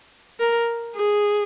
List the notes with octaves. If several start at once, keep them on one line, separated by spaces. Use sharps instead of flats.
A#4
G#4